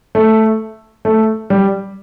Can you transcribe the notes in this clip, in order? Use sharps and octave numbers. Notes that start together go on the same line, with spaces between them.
A3
A3
G3